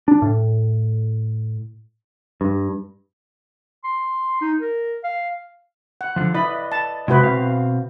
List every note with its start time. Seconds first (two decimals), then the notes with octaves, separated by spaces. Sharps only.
0.08 D4
0.22 A2
2.41 G2
3.84 C6
4.41 D#4
4.59 A#4
5.04 F5
6.01 F#5
6.16 D3 F3
6.34 E4 B4 D5 D#5 B5
6.72 A5
7.08 C3 G#3 E4 F#4 B4
7.23 B2 C4 F5